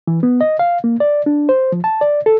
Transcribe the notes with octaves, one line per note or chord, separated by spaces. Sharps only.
E3
B3
D#5
F5
A#3
D5
D4
C5
F3
A5
D5
A4